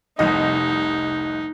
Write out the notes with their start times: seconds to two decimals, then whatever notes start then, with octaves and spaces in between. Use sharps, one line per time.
0.19 F1 C2 D#4 D#5